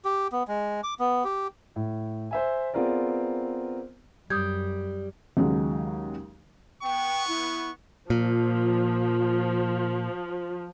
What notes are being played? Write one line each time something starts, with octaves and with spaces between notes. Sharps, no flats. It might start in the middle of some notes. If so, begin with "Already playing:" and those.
G4
B3
G#3
D6
B3
G4
A2
C5 E5 G#5
B3 C4 F4 G#4 A#4 D5
F#2 G3 D#6 G6 G#6
D#2 C#3 F#3 G#3
B3 G5 C#6
E4
A#2 F3